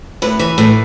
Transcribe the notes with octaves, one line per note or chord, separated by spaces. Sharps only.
A2 B4
E3
A2